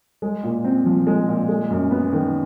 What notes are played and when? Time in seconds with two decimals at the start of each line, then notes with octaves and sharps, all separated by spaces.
0.22 G#3
0.44 A#2
0.64 C4
0.86 F3
1.07 G#3
1.28 A#2
1.49 G#3
1.70 F#2
1.91 B3
2.13 D#3